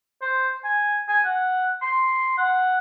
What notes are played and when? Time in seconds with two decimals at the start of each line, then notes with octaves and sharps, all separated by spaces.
0.22 C5
0.64 G#5
1.08 G#5
1.25 F#5
1.82 C6
2.38 F#5